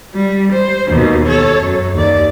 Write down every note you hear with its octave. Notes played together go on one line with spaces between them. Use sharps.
G3
C5
D#2 B2
A4 C#5
F#2
D#2 D5